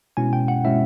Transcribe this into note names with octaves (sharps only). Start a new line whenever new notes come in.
B2 G#3 C#4 E4 G#5
G5
F#5
B2 G#3 C#4 E4 E5